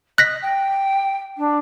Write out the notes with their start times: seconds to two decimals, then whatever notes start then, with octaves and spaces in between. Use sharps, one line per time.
0.18 D#5 F#6 A#6 B6
0.42 G5
1.37 D4